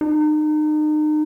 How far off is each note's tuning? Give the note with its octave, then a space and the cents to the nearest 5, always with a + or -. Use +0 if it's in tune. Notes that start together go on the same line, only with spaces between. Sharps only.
D#4 -35